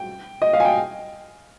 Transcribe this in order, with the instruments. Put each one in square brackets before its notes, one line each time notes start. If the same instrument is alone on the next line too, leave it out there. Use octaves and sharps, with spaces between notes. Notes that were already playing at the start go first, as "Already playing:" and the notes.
Already playing: [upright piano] G5
D#5
F5
G#5
G5